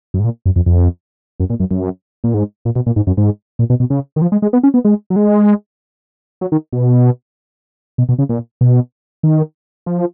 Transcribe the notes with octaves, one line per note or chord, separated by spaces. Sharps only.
F#2
G#2
A#2
F#2
F2
F2
F#2
A#2
F#2
F#2
A#2
G#2
A#2
B2
A#2
G#2
F#2
G#2
A#2
B2
B2
C#3
D#3
F3
G#3
G#3
B3
C#4
B3
G#3
F#3
G#3
F#3
D#3
B2
B2
B2
C#3
A#2
B2
D#3
F3